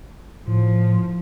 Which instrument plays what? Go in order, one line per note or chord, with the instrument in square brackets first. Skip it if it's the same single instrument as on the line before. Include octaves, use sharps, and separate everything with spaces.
[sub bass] A2 [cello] F3